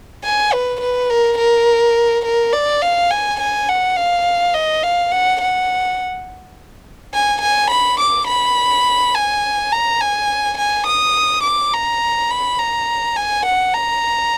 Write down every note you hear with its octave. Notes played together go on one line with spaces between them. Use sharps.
G#5
B4
B4
A#4
A#4
A#4
D5
F5
G#5
G#5
F#5
F5
D#5
F5
F#5
F#5
G#5
G#5
B5
D6
B5
G#5
A#5
G#5
G#5
D#6
D6
A#5
B5
A#5
G#5
F#5
A#5